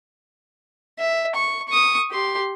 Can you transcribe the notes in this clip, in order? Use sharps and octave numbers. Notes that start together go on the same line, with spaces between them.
E5
C#6
C#6 D#6
G4 C6